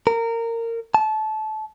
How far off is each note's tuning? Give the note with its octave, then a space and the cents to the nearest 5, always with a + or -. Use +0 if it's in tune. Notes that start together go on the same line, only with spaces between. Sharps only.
A#4 -20
A5 -25